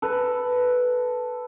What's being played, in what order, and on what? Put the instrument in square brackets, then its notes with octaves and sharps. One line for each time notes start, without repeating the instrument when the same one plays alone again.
[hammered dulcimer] A4 B4